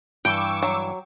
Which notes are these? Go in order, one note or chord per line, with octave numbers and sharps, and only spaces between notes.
G2 E3 G5 C#6 D6 E6
F#3